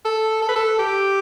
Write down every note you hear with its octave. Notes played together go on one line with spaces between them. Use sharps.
A4
A4
B4
A4
G4